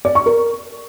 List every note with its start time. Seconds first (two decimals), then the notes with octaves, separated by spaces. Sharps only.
0.05 D5
0.15 C#6
0.26 A#4